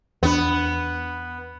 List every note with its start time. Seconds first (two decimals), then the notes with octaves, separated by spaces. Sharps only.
0.23 E2 B3 D4